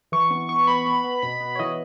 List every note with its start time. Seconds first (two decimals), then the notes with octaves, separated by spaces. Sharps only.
0.12 E3 C#6
0.31 B3
0.49 B3 C#6
0.67 B3 B5
0.86 B3 B5
1.04 B3
1.22 B2 B5
1.40 B3
1.55 C#5
1.59 E3 D#5